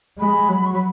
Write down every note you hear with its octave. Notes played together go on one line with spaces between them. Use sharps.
G#3 B5
F#3
C#6
B5